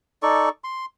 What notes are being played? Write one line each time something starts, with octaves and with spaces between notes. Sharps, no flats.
D#4 A4 D5 C#6
C6